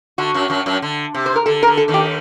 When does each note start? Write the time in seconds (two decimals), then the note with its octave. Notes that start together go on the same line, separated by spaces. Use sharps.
0.18 D3 F#4
0.34 F#2 F#3
0.50 F#2 F#3
0.66 F#2 F#3
0.82 D3
1.15 C3
1.26 C5
1.36 A#4
1.46 D3 A4
1.63 A#4
1.67 D3
1.77 A4
1.88 D#2 D#3
1.94 G4